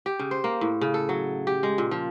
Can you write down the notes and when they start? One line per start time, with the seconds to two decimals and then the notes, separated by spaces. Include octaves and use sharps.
0.06 G4
0.19 C#3
0.31 C5
0.44 A#3
0.61 A2
0.81 C#3
0.94 A4
1.09 F#3
1.47 G4
1.63 G#3
1.78 A#2
1.91 F3